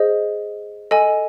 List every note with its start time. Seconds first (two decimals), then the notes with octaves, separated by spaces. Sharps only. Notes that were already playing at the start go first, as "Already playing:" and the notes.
Already playing: G#4 C5 D#5
0.91 A4 D#5 G#5